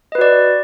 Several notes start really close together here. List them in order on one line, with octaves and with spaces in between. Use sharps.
D#5 B4 F#4 D5